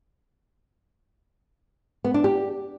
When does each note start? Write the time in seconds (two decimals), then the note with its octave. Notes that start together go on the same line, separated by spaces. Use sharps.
2.04 B3
2.14 D4
2.24 G4